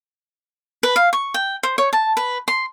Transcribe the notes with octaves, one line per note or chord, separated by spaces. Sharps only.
B4
F5
C#6
G5
C5
C#5
A5
B4
C6